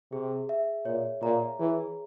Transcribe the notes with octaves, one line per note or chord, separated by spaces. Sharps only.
C3 G#4
E5
A#2 C#5
A#2 A#5
E3 G#4